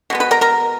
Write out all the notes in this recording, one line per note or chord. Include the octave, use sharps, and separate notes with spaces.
B2 G#3 B3
B4 B5
A#4 A#5
A#4 A#5